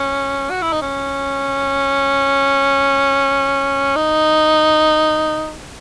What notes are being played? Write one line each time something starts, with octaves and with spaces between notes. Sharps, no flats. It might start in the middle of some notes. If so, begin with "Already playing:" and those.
Already playing: C#4
F#4
E4
D#4
C#4
D#4